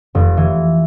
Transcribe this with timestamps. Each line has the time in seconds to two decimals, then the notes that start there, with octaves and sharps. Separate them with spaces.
0.15 F1
0.37 E3